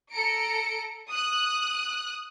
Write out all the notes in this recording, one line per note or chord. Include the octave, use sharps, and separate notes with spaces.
A4 A#5 C#7 D7
D#6 F#6